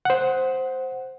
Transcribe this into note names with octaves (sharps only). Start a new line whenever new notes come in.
C5 F#5